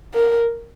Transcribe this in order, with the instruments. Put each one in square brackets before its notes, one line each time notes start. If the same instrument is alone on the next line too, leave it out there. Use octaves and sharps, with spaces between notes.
[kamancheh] A#4